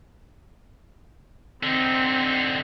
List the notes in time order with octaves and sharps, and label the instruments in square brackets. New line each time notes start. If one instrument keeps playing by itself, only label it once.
[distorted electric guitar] D3 D#4 [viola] C4